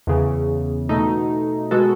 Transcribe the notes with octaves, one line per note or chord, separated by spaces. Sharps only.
E2 C#3 E3
B2 A3 D#4
B2 G#3 B3 F#4 A4